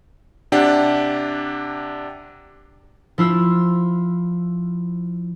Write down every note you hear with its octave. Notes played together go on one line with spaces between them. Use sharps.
C3 D4 G4 F#5
F3 E4 F4 E6